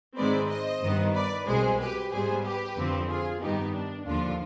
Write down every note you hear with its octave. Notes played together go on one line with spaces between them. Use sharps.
G#2 D#3 G#3 C4 B4 D5
C5 D#5
G2 D#3 B3
B4 D5
C2 B2 G#3 G#4 C5
G4 B4
G#2 G3 B3 G#4 C5
G4 B4
F2 D3 F3 C4
F4 G#4
G2 D#3 B3 D#4 G4
D4
D#2 D3 F3 D4 F4